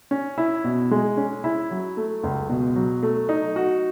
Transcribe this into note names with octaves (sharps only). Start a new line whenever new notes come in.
C#4
E4
B2
G#3
C#4
E4
F#3
A3
C#2
B2
F#3
A3
D#4
F#4